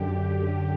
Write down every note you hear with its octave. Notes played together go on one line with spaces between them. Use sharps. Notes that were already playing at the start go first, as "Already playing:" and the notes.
Already playing: F#2 D3 G4